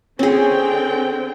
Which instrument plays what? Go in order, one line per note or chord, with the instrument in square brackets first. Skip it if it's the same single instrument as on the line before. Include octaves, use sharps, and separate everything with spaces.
[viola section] D3 C4 G5 [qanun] C#4 G#4